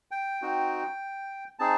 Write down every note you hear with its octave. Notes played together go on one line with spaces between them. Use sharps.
G5
C4 D#4 F#4
C4 D#4 G#4 A5